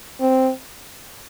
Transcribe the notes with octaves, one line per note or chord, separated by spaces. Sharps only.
C4